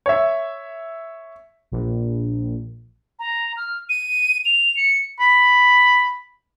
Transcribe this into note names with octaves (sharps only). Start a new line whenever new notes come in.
C#5 E5
A#1
A#5
F6
D#7
F7
C#7
B5